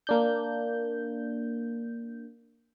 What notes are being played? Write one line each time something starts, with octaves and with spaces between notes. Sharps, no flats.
A#3 D4 G6